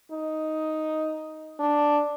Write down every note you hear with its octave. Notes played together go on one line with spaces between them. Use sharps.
D#4
D4